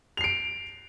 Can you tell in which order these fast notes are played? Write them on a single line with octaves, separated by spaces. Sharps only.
F7 C7 D7